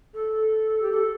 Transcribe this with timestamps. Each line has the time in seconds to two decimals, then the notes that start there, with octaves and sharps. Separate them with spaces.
0.14 A4
0.82 G4
0.91 A4